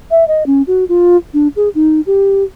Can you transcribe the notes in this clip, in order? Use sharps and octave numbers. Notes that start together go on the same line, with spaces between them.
E5
D#5
C#4
F#4
F4
D4
G#4
D#4
G4